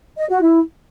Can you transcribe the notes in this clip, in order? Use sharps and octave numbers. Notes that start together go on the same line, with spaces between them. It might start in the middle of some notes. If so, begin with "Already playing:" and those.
D#5
F#4
E4